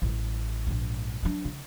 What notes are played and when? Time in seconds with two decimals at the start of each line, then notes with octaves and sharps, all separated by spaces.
0.02 A1 G3
0.67 A#1 G#2
1.23 F#3 D4
1.45 C#3